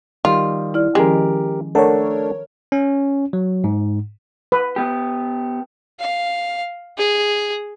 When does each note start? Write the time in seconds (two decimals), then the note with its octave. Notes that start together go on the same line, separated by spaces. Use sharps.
0.25 D#3 G3 F4
0.74 E4 D5 F6
0.95 D#3 F3 G#3 C#4 G4 A#4
1.75 A3 D4 A4 A#4 C#5 F#5
2.72 C#4
3.33 F#3
3.64 G#2
4.52 B4
4.76 B3 G4
6.00 F5
6.98 G#4